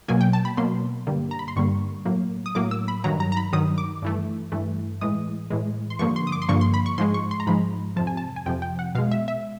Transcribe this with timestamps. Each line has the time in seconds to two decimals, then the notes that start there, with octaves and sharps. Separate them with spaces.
0.08 B2 F#3 A#3 G#5
0.21 G5
0.33 A5
0.45 B5
0.57 B2 F#3 A#3 C6
1.07 G2 D3 G3 A#3
1.31 A#5
1.39 B5
1.48 C6
1.56 G2 D3 G3 A#3 C#6
2.05 A2 F#3 A#3
2.46 D#6
2.55 A2 F#3 A#3 D6
2.71 E6
2.88 B5
3.04 G2 D#3 F#3 A#5
3.20 A#5
3.32 A#5
3.37 B5
3.53 G2 D#3 F#3 D#6
3.78 D6
4.02 G2 E3 A3
4.52 G2 E3 A3
5.01 A2 E3 G#3 D#6
5.50 A2 E3 G#3
5.90 C6
5.99 G2 D3 F3 A#3 C#6
6.16 C6
6.27 D#6
6.32 D6
6.42 C6
6.49 G2 D3 F3 A#3 C#6
6.61 C6
6.74 B5
6.86 C#6
6.98 G#2 F3 G#3 C6
7.14 C#6
7.31 C6
7.40 A#5
7.47 G#2 F3 G#3 B5
7.96 F2 C3 F3 A5
8.07 G#5
8.17 A5
8.36 G#5
8.46 F2 C3 F3 G5
8.62 G5
8.79 F#5
8.95 B2 F5
8.98 G#3
9.11 E5
9.28 E5